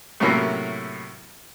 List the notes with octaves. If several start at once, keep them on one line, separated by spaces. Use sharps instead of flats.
A2 C3 F#3 A#3 C#4 E4